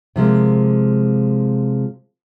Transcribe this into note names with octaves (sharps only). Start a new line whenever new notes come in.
C3 F3 G#3 A#3